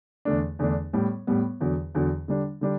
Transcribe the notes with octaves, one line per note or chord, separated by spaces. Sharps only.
E2 D3 A3 D4
E2 D3 A3 D4
A2 G3 B3
A2 G3 B3
E2 D3 F#3
E2 D3 F#3
D3 G3 D4
D3 G3 D4